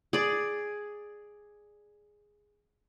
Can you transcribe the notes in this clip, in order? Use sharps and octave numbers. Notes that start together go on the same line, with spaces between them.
G#4 D5